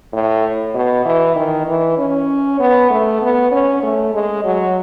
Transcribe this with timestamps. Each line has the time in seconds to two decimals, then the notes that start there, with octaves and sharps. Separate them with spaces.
0.13 A2
0.74 B2
1.06 E3
1.36 D#3
1.67 E3
1.98 C#4
2.60 B3
2.91 A3
3.21 B3
3.52 C#4
3.83 A3
4.14 G#3
4.45 F#3